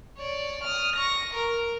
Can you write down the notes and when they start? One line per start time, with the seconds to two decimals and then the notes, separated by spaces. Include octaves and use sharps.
0.18 C#5 D5
0.64 D#6 F6
0.96 C#6 A#6
1.34 A#4